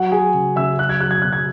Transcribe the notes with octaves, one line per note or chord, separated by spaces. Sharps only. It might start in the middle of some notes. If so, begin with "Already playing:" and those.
Already playing: F#3 F#4 F#5
F#3 G#4 G#5
C#3
C#3 E5 E6
F#3 F#6
G#6
F#3 F#6
G#6
B2 F#6
G#6